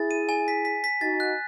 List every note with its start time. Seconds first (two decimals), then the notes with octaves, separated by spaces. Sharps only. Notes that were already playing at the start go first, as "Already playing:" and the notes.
Already playing: E4 G#4 A6
0.11 D#7
0.29 G#5
0.48 B6
0.65 B6
0.84 B6
1.01 D#4 F#4 A6
1.20 F#6